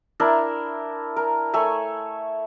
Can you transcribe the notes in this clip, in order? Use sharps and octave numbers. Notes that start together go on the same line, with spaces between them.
D4 E4 A#4 E5
A#4
A3 C#5 E5 G#5